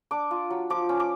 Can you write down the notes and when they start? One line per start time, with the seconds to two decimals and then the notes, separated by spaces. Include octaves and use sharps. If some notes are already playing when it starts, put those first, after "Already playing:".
0.11 D4 D6
0.31 F4
0.50 F#3
0.70 F3 D6
0.89 C#4
1.00 D6